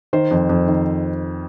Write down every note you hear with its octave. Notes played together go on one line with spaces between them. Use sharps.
D#3 C5
F2
F2
D#3